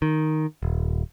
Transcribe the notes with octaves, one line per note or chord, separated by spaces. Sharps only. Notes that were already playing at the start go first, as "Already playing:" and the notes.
D#3
D#1